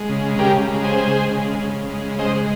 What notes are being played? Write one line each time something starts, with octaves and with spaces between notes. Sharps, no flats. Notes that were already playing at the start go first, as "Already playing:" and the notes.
Already playing: G#3
C#3
C#3 G4 A#4
G#3
G#4 C5
G#3
C#3
C#3
G#3
G#3 C5 D#5